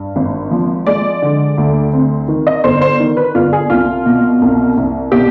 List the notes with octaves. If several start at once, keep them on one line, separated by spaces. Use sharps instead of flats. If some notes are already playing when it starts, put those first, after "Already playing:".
Already playing: G2
G#1
F3
G#3 D5
D3
D2
C4
D#3
D#5
G1 C5
C5
D#3
B4
G1 F4
G#4
C2 F4
B2
C2
C2
B2 G4